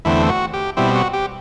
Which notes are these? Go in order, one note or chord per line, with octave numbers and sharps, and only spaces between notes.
E2 D3 A3 C4 E4
F#4
G4
B2 G3 C4 E4
F#4
G4